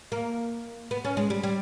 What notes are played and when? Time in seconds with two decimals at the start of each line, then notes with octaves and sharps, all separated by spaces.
0.12 A#3
0.91 B3
1.05 C#4
1.17 G#3
1.30 G3
1.43 G3